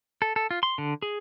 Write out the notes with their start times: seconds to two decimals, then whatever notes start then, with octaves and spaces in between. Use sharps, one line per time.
0.22 A4
0.36 A4
0.51 F4
0.63 C6
0.78 D3
1.02 G#4